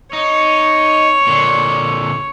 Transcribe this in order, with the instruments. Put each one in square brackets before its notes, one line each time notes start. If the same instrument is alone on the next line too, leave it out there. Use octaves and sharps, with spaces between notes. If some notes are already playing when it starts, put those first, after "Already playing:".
[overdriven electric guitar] D#4 [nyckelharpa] C#5
[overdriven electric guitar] A#2 D3